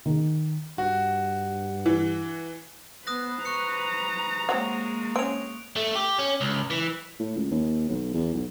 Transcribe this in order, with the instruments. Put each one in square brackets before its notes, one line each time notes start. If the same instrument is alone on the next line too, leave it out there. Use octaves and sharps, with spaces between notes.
[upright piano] D#3
[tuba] G2 [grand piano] F#4
[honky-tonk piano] E3
[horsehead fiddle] B3 [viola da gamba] B4 C5 [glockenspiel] D#6 F#6 A#6
[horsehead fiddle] A#5 [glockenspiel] C#6 F#6 C#7
[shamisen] F#3 C4 F#4 [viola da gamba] G#3 A#3
[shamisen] C4 C#4 [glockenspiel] D7 F7
[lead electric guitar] A3
G4
C#4
C#2
E3
[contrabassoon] A2
C#2
D#2
B1
E2
B1